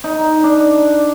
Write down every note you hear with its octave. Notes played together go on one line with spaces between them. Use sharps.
D#4
D4